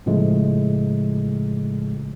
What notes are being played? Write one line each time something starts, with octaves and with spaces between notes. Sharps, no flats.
A2 C#3 F3 G#3 A3